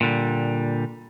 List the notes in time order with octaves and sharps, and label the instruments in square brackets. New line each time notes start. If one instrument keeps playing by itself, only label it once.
[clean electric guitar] A#2 D3 G3